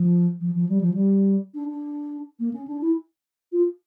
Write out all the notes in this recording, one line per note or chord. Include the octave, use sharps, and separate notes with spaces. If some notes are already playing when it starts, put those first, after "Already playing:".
Already playing: F3
F3
F3
G3
F3
G3
D4
D4
A#3
C#4
D4
E4
F4